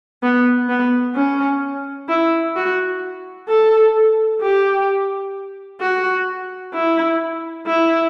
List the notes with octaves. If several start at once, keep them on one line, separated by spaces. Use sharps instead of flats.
B3
B3
C#4
E4
F#4
A4
G4
F#4
E4
E4